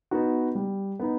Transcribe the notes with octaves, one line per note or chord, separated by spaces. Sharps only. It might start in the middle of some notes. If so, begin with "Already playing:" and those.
B3 D#4 F#4
G3
B3 D#4